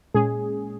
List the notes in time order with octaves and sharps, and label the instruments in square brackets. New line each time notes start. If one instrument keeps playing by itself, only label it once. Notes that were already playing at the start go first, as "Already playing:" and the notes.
[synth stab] A#2 G#3 C#4 G#4